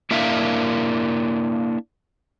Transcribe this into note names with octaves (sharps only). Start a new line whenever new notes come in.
A#3 D4 E4 A#4 E5 F5